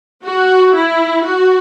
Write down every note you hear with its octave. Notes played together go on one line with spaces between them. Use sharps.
F#4
E4
F#4